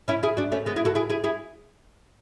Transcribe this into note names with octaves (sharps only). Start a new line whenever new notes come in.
C#4 E4
E4 G#4
D4 F#4
A3 C#4
G#3 B3
E4 G#4
F#4 A4
E4 G#4
E4 G#4
E4 G#4